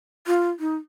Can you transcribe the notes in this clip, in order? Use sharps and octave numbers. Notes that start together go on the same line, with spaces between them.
F4
D#4